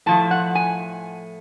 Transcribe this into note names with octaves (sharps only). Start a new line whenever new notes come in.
A2 F3 A3 A5
F#5
G#5